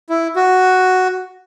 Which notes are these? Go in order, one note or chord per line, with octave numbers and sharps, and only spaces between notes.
E4
F#4